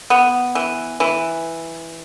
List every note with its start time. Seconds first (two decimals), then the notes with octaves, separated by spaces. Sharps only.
0.10 B3
0.55 E3
1.00 E3